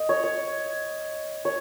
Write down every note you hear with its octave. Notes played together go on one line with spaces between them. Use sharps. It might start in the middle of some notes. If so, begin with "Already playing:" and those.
Already playing: D#5
C#5
C#5
C#5